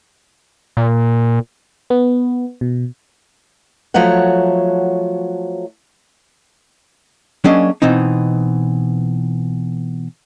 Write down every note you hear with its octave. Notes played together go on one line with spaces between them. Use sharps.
A#2
B3
B2
F3 F#3 A3 C#5 F#5
F#3 A#3 C#4 D4 G#4 D#5
B2 E3 C4 D#4